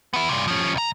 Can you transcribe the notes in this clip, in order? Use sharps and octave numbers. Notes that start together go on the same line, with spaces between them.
B3 E4
G2 C3
F3 C#4
B1 A#5